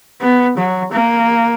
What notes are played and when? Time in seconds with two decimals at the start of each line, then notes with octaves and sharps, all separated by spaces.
0.21 B3
0.57 F#3
0.92 A#3